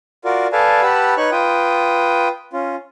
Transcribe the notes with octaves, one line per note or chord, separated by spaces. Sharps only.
F4 F#4 A#4 D5
A4 B4 D5 F5 G#5 A5
G4 B4 F#5 A5 B5 E6
D#4 B4 C#5 C#6 F#6
F4 B4 G5 D#6
C#4 F4